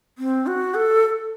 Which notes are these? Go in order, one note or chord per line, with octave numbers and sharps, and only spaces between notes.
C4
F#4
A4